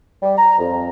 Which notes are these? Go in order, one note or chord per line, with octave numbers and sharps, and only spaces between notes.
G3
A#5
F2